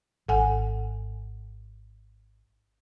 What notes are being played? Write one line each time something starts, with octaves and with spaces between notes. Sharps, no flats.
G#1 A4 F#5 G#5